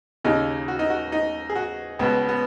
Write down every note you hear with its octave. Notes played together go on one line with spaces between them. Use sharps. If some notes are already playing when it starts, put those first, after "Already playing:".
D#2 C#3 D#4
F#4
D#4
F#4
D#4
G#4
F#4
C#2 B2 B3
B3